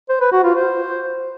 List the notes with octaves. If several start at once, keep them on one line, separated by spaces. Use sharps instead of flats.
C5
B4
F#4
F4
C5